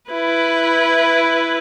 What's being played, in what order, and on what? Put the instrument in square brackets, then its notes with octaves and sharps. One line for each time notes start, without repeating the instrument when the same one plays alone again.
[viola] E4 B4